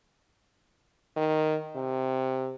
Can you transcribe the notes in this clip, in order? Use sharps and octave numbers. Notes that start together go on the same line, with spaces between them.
D#3
C3